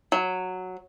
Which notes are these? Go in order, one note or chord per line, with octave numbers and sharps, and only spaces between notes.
F#3